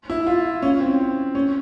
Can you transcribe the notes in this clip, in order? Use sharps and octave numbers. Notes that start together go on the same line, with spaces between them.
E4
F4
C#4
C4
C#4